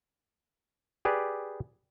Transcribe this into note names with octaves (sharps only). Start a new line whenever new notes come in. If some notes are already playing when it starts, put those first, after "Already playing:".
G4 G#4 B4 D5